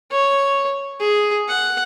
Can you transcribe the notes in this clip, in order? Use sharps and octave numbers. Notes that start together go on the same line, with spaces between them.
C#5
G#4
F#5